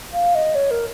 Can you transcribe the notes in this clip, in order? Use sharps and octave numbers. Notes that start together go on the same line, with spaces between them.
F5
D#5
C#5
A#4